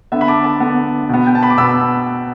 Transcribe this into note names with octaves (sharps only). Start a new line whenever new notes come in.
D3 B3 E5
B5
A5 D6
A5 D6
D3 B3
B2 B3
G5
A5
B5
D6
B2 B3 B5 E6